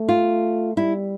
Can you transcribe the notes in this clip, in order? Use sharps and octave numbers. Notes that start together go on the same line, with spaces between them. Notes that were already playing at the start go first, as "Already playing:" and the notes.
Already playing: A3
F4
G3 E4